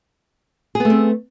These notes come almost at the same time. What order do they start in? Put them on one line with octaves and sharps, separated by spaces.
G#4 B3 A3 C4